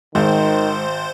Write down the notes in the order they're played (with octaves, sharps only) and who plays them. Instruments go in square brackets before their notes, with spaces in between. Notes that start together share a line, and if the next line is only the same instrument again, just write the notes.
[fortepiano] G#1 [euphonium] D#3 [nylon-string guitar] G#3 [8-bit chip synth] C5